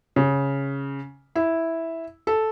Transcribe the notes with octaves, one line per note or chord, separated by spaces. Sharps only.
C#3
E4
A4